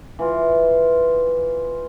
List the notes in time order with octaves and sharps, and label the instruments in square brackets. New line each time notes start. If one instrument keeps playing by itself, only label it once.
[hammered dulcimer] E3 F4